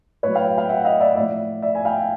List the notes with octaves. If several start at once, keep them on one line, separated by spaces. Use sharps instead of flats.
A2 F#3 B4 C#5
F5 G5
F5 G5
E5 F#5
D#5 F5
D5 E5
A2 F3 D5 E5
D5 E5
G#5
F5 G5